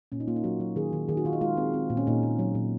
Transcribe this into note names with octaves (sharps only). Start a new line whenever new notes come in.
A#2 C#4
D#4
A#3 F4
D#4
F#3 F#4
F#3
D#3 G#4
D#3
D#3 G#4
F#4
D#3 F4
D#4
G#3 F4
C4
C4
A#2
C#4
A#2 D#4
A#2
F#3
A#2